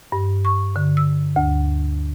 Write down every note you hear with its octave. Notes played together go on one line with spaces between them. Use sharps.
G2
C#6
D3
E6
D2